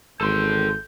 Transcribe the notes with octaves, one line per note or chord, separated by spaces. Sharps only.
G#1 A4 C6 G6